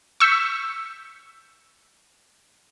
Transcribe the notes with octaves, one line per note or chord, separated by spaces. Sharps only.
C#6 E6 G6 B6